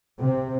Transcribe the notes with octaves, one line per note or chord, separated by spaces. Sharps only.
C3